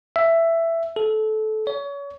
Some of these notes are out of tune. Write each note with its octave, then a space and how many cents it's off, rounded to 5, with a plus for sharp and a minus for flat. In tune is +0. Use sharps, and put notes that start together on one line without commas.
E5 +10
A4 -20
C#5 +30